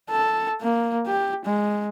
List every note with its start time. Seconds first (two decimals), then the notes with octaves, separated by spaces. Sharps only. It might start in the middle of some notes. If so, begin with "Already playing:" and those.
0.10 A4
0.61 A#3
1.07 G4
1.45 G#3